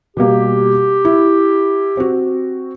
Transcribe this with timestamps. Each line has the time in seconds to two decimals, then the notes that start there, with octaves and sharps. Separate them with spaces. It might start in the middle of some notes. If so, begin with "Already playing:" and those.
0.17 B2 G3 A#3 G4
1.05 E4
1.97 C4 F#4